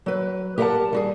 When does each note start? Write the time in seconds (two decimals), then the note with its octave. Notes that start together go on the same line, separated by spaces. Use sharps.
0.06 F#3 B4
0.58 G4 A#4 D#5 F5 F#5 A5
0.93 G3 F#4 G#4